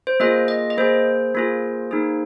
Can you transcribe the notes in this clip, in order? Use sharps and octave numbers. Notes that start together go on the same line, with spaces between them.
C5
A#3 F4 G#4 D#5
D#5
D#5
A#3 G#4 C5
A#3 F4 G#4
A#3 D#4 G#4